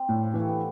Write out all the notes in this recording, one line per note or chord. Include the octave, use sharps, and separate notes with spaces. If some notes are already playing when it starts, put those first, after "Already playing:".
Already playing: C4
A2 D4
F3
E3 G3
A3
B3